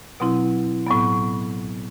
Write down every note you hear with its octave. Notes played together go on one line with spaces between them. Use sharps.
B2 F#3 C4 E4
A2 F#3 B3